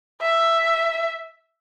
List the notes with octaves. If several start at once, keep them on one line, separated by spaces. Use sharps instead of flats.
E5